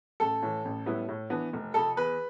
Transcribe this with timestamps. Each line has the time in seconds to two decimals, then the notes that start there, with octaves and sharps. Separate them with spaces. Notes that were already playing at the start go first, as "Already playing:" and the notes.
0.20 A1 A4
0.43 A2 E3
0.65 A1
0.86 A2 G3 B3 E4
1.09 A2
1.30 E3 B3 D4
1.53 F1
1.74 F2 C3 A4
1.96 E2 B4